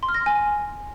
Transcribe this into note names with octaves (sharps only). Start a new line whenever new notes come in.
C6
F6
A#6
C6
G#5